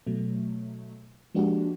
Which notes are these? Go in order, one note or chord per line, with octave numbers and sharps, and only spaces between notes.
B2 F#3 A3
F3 G#3 A#3 D4 F#4 G4